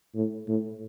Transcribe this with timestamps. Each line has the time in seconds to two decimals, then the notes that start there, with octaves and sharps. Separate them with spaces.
0.15 A2
0.48 A2